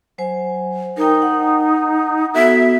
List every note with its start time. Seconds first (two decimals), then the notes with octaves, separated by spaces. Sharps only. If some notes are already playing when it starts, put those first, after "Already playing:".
0.18 F#3 C5 G#5
0.97 D#4 A#4 G5
1.22 F#5
2.34 B3 F#4 A4 E5